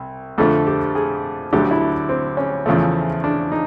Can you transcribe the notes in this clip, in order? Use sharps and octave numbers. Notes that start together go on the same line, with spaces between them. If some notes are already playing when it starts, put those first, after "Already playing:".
Already playing: C2
F2 D3 F3 A3 A4
G4
G#4
D2 D3 F#3 A3 G4
E4
C4
C#4
E2 C#3 F3 A3
D4
D#4